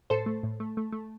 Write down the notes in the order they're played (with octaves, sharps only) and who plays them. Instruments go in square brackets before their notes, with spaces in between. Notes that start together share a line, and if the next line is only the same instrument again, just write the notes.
[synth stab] A2 A4 C5
A3
A2
A3
A3
A3